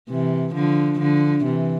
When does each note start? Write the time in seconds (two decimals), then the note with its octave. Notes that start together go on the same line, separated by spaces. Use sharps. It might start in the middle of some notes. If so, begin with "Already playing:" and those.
0.09 C3 E3
0.54 D3 F3
0.99 D3 F3
1.44 C3 E3